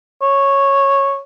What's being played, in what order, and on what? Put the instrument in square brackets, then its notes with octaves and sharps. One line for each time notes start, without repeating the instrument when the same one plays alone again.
[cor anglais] C#5